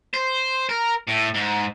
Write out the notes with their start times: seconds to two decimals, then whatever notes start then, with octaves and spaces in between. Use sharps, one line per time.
0.14 C5
0.69 A#4
1.07 A2
1.34 G#2